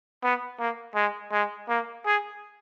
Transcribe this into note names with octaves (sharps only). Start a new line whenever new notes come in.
B3
A#3
G#3
G#3
A#3
G#4